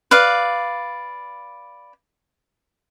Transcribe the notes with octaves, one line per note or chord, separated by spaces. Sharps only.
B4 D5 F5